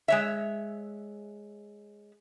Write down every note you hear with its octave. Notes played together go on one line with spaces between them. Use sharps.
G#3 C#5 E5